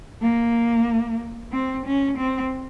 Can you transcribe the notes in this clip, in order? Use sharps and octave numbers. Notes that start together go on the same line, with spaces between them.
A#3
C4
C#4
C4